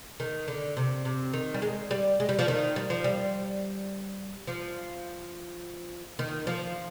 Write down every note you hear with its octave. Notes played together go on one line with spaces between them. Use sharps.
D#3
D3
C3
C3
D#3
G3
G#3
G3
G#3
G3
F3
D#3
G3
F3
G3
F3
D#3
F3